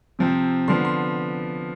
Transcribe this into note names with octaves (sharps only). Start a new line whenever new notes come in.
C3 F3 C4
D3 F3 B3 C6
C6